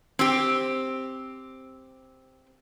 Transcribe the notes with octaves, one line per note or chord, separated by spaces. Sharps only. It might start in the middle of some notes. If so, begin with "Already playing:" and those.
C4 G4